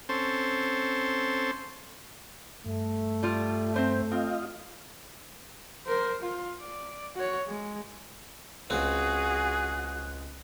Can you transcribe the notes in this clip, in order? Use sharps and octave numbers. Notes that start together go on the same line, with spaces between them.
C4 C#4 A4 C5
G2 A3
G3 F4
C4 C5 E5
C4 F4 D#5 F5
A#4 C5
F4
D5
F#4 C#5
G#3
C#2 C4 F#4 G#4 F#6